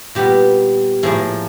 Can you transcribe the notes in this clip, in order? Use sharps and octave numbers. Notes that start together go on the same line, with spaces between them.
A#2 G3 B3 G4
A2 F3 A#3 G#4